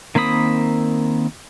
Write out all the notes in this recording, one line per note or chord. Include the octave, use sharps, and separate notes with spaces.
D#3 A#3 C4 B5 D#6